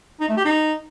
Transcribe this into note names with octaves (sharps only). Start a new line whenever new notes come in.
D#4
A3
G4
D#4